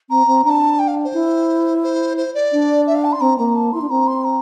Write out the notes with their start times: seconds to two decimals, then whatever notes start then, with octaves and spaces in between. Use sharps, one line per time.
0.10 C4 A#5
0.27 C4
0.44 D4 A#5
0.49 A5
0.79 G5
0.88 F5
1.04 C5
1.13 E4
1.83 C5
2.17 C5
2.35 D5
2.52 D4
2.87 E5
2.95 F5
3.04 A5
3.12 C6
3.21 C4 A#5
3.38 A#3 A#5
3.55 A5
3.73 E4 C6
3.81 D4
3.90 C4 A#5
4.07 C6
4.24 A#5